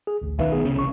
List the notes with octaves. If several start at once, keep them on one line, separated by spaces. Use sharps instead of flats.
G#4
A1 D2
B1 D#3 B4 E5 F5
B3 G#4
C2 C#3
A1 C#6